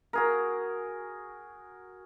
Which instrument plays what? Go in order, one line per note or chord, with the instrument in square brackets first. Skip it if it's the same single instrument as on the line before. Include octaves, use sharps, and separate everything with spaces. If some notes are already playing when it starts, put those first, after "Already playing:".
[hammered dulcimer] F#4 G#4 A#4